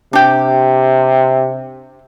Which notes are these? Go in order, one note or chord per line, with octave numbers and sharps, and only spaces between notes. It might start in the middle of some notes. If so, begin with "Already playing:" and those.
C3 D4 G4